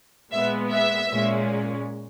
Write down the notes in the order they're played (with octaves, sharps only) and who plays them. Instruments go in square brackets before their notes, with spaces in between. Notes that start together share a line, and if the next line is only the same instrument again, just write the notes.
[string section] A#2 G#3 B3 E5
E5
A#2 G#3 C#4